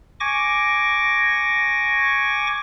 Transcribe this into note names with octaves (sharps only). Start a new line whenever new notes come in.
G#5 C#6 D6 A#6